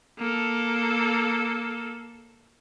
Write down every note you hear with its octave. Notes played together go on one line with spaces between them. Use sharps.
A#3 A4